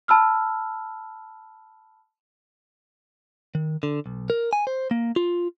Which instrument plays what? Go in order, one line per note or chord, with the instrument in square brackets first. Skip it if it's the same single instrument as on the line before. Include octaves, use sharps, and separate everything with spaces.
[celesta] A5 B5 E6 F6
[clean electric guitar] D#3
D3
B1
A#4
G#5
C5
A#3
F4